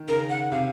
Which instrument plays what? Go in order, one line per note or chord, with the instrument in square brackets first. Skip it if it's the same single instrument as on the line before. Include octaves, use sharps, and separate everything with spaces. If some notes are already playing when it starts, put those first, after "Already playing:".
Already playing: [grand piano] D#3
[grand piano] C#3 [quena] A#4
[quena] F#5
[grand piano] C3 [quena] F5